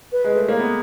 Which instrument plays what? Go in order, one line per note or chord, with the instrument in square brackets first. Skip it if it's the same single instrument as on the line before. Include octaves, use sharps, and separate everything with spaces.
[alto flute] B4
[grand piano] G#3
A3
A#3
B3